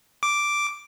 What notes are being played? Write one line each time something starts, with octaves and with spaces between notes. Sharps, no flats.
D6